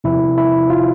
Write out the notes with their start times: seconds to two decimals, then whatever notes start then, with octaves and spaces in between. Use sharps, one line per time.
0.04 E2 C3 F3 E4
0.38 E4
0.70 F4